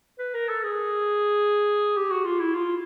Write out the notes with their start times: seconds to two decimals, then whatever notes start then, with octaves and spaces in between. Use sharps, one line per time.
0.19 B4
0.34 A#4
0.49 A4
0.63 G#4
1.96 G4
2.12 F#4
2.25 F4
2.40 E4
2.55 F4